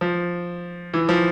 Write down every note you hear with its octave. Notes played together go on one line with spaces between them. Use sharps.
F3
E3
F3